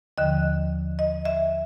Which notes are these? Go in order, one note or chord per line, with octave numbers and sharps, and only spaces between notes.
D#2 D3 F3 D#5
D#5
E5